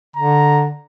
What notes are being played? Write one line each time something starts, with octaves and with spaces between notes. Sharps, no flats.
D3 A#5